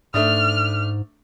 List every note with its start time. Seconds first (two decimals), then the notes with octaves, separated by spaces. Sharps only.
0.14 G#2 A3 D4 D#6 F6